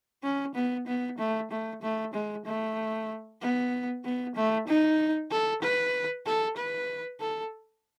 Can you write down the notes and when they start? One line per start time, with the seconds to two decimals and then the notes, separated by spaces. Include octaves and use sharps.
0.23 C#4
0.55 B3
0.87 B3
1.18 A3
1.51 A3
1.82 A3
2.13 G#3
2.45 A3
3.41 B3
4.04 B3
4.35 A3
4.67 D#4
5.31 A4
5.62 B4
6.25 A4
6.57 B4
7.20 A4